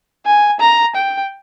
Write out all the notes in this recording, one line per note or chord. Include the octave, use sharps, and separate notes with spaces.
G#5
A#5
G5